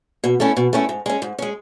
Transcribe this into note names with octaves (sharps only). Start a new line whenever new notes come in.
B2
A3 C#4 E4
B2
A3 C#4 E4
G#2
G#3 C#4
G#2
G#3 C#4